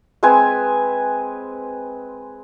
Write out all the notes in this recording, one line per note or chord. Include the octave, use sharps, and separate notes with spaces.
G#3 C4 B4 G#5